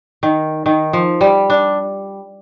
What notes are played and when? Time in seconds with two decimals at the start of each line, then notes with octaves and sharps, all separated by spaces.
0.23 D#3
0.66 D#3
0.93 F3
1.21 G3
1.50 D4